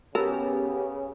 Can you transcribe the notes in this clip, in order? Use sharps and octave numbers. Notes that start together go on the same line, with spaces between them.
C#3 B3 C#4 G4 A4 A#4